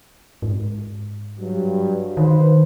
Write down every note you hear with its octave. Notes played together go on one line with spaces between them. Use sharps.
G#2
G2 F#3
D#3 B4 C5